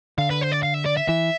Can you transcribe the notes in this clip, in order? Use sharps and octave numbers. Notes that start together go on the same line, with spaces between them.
D3 F5
B4
C5
D5
F5
E5
D5
E5
E3 E5